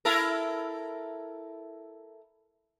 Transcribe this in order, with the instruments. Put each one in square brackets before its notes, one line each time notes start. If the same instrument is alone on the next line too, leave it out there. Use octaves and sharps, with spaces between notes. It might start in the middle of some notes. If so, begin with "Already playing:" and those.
[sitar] E4 A4 A#4